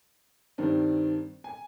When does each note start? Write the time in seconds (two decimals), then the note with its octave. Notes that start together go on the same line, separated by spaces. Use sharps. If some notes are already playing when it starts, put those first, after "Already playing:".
0.58 G2 D#3 C4 D4
1.44 G#5